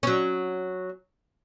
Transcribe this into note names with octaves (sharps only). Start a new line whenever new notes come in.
F#3 C#4